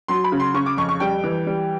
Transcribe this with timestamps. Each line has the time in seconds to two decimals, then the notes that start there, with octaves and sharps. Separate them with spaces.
0.08 F#3 C6
0.24 B5
0.32 C#3
0.40 C6
0.54 C#3 C#6
0.66 D6
0.77 F2 C#6
0.89 C#6
1.00 G3 G5
1.24 E3
1.47 G3